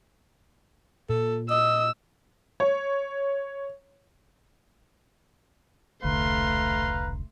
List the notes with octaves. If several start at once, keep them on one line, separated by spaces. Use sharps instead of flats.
A#2 A4
D#5 E6
C#5
E1 C2 D3 A3 B4 F5 A#5 C6